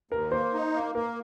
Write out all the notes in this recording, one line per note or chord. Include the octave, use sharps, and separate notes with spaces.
D#2 A#4
A#3 C5
D#4
A#3
A#3 A#4